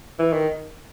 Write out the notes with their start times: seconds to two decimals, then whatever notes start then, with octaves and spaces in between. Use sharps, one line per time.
0.19 E3
0.33 D#3